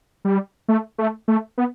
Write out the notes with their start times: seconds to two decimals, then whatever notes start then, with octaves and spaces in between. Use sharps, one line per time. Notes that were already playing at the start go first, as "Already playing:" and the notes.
0.25 G3
0.68 A3
0.98 A3
1.28 A3
1.58 B3